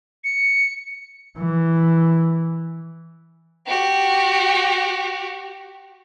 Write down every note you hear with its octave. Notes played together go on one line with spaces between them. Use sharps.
C#7
E3
F#4 G4